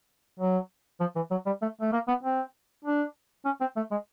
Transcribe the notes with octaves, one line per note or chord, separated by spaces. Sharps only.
F#3
F3
E3
F#3
G3
A3
A3
A#3
B3
C4
D4
C#4
C4
A3
G#3